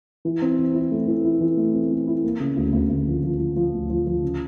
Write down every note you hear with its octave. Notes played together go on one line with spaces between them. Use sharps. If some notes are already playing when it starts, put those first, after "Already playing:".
E3
C4
E3
E4
A3
E3
E4
E3
A3
C4
A3
E4
A#3
C#3
D2
D2
D2
F3
F3
F3
F3
D2
F3
F3
C#3